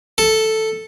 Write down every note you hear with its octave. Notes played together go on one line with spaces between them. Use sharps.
A4